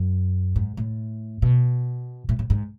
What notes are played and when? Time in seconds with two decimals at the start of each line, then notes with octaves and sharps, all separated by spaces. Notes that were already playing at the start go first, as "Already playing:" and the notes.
Already playing: F#2
0.56 G#2
0.77 A2
1.42 B2
2.29 A2
2.39 A2
2.50 G#2